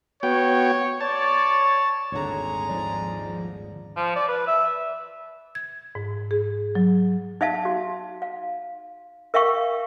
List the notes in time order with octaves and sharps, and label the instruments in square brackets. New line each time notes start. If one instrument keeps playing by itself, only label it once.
[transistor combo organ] B3 F#4 G5 [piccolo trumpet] C#5
[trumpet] C#5 [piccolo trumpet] D5 [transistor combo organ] A5
[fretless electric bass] D#1 G#1 D3 [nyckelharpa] G#3 A#5 [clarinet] C#5
[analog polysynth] G#2 F3 [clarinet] D5
[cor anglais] F3
D5
B4
E5
[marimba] G#6
G#2
G#4
F#3
[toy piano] D#4 E5 F5 A5
F#4
F5
A#4 E5 F5 G5 C#6